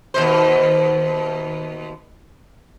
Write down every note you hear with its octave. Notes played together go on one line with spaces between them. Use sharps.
D#2 B2 C5